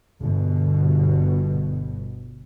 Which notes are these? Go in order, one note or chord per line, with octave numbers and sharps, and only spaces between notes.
G1 B2